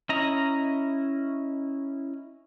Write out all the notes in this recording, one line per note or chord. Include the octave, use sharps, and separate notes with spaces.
C#4 E4 D#5 A#5